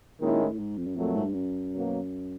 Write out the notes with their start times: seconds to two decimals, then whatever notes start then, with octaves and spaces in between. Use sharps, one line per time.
0.20 A#2 D#3 G#3 C#4 E4
0.40 A2
0.59 G#2
0.77 F2
0.87 F#2
0.96 F2 A#2 F#3 A3
1.15 G#2
1.25 G2
1.33 F#2
1.72 B2 F#3 A#3